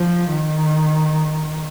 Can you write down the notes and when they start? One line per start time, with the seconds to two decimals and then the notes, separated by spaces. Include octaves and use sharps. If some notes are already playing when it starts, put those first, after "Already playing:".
Already playing: F3
0.31 D#3